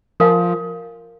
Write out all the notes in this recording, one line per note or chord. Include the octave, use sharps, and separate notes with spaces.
F3 A#4 F5 G#5